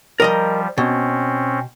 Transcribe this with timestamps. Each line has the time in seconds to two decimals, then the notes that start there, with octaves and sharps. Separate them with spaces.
0.20 F3 G3 A#4 D#5 A#5
0.78 B2 C4 C#4